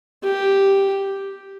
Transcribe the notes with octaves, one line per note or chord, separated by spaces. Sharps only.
G4